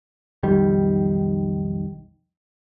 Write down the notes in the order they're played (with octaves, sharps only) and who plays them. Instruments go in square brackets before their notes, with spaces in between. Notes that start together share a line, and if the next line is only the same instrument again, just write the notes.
[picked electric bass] B1 F2 D#3 G3